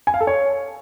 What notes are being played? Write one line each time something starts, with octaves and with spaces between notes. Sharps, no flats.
G#5
F5
A4
C#5